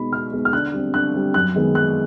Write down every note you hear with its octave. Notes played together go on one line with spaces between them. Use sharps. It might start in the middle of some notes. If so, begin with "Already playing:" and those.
Already playing: B2 G#3 B3 D#4 B5
B2 F6
G#3 B3 D#4
F6
D3 F#6
G3 C4
D3 F#6
G3 C4
F#2 F#6
D#3 G#3 B3
F#2 F#6